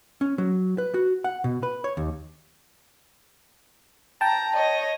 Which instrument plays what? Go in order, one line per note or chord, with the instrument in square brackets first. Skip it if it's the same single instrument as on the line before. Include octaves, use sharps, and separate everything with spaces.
[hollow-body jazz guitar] C#4
F#3
B4
F#4
F#5
B2
B4
C#5
D#2
[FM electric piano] G5 A5 [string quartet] A#5
[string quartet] C#5 D#5